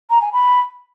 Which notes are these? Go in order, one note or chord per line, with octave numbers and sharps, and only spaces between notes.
A#5
G#5
B5